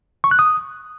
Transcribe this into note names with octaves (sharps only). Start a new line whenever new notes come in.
C#6
F#6
D#6